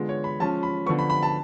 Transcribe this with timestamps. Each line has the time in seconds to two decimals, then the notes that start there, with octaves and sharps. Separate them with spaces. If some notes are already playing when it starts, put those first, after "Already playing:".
Already playing: D3 G#3 B3 F4
0.09 C#5
0.24 B5
0.40 F3 G#3 C#4 F4 A5
0.63 B5
0.86 D3 F3 B3 C#6
0.99 B5
1.10 B5
1.23 A5